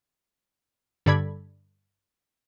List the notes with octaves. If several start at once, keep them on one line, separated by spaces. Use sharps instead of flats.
G2 D3 A4 D5 B5 G#6